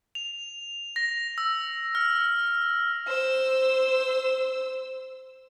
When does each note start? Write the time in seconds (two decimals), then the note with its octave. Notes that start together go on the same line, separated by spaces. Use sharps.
0.15 F7
0.96 A#6
1.38 E6
1.95 F6
3.07 C5 E6